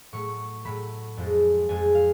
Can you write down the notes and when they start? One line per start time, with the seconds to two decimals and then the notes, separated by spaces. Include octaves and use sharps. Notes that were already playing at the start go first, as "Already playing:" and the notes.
0.12 A2 F#3 A3 C#6
0.65 A2 F#3 A3 B5
1.17 F2 F3 G#3
1.69 F2 F3 G#3 G#5
1.95 F5